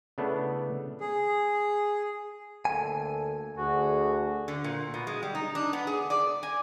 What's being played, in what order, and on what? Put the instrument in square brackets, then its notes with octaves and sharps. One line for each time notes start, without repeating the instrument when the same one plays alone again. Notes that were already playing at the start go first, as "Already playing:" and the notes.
[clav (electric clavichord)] C#3 A3 B3 D4 E4 A4
[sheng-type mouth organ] G#4
[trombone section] D2 A#3 A4 [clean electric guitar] G#5
[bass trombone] D2 [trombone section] D3 G#4 [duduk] F#4
[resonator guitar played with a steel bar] D3
A#2
B2
G#3
G3
D#4
D4
B3
G#4
D5
G#5